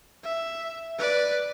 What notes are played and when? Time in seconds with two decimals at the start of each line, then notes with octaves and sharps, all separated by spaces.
0.24 E5
0.99 B4 D5